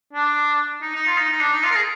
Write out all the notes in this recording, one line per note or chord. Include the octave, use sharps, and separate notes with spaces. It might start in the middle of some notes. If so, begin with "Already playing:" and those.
D4
D#4
D#4
F4
D#4
D#4
D4
D#4
F4
A#4
G#4